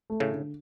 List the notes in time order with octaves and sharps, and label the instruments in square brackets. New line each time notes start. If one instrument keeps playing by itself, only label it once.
[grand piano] A3
[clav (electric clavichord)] A2 C#3
[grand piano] D3